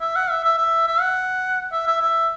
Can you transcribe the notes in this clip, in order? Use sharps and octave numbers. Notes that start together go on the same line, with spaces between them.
E5
F#5
E5
E5
E5
E5
F#5
E5
E5
E5